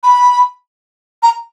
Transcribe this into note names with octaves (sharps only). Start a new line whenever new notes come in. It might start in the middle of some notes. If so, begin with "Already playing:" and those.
B5
A#5